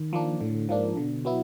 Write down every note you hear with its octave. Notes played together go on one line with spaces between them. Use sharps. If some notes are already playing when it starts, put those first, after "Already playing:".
Already playing: D#3
F3 A#3 D4
A2 D3
G#2 F3 A#3 D4
B2 D3
F#3 B3 E4